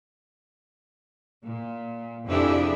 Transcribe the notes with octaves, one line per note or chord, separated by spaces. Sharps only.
A#2
F2 C3 D4 E4 G4 G#4